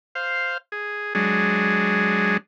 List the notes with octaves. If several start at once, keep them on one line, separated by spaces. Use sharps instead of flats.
C5 F5
G#4
F#3 G#3 D4 G#4